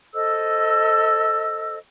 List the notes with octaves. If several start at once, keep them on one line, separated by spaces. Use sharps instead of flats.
A4 C5 D#5 E6